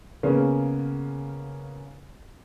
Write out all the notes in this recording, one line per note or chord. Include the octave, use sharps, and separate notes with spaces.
C#3 A#3 B3 C#4